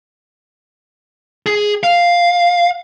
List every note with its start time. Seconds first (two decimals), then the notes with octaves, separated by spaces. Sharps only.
1.46 G#4
1.83 F5